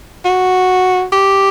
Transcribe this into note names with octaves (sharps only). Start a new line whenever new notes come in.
F#4
G4